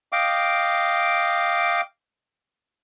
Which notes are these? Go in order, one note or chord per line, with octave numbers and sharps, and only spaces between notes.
D#5 F5 G5 D6